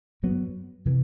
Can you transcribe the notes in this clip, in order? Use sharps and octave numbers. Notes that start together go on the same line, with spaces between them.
G2 F#3 B3
C3 E3